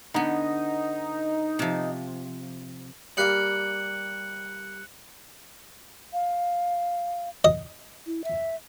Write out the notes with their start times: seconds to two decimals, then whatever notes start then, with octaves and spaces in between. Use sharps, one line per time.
0.14 D3 B3 D#4
1.59 C3 F3
3.17 G3 A#3 F5 F#6 C#7 F#7
6.13 F5
7.44 D#5
8.07 E4
8.24 E5